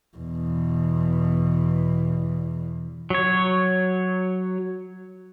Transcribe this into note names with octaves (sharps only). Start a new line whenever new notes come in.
E2 B2
F#3 C#5